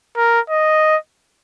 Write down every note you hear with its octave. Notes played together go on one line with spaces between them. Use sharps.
A#4
D#5